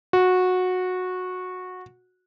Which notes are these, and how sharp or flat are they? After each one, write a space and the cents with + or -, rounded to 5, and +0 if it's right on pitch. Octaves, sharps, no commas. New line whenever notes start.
F#4 -15